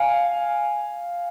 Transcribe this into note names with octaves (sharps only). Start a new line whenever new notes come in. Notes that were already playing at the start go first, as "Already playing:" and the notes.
Already playing: F5 G#5